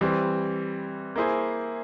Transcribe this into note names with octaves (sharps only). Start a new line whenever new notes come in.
E3 G3 C4
A#3 E4 G#4 C5